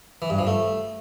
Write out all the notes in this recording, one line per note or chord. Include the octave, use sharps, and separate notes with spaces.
E3
G2
F3
A3